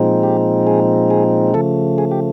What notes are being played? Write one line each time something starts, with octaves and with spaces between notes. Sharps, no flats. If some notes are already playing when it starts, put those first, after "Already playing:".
Already playing: A#2 F3 G#3 C4 D#4
G4
G#4
G#4
C#3 F3 A3 A4
G#4
G4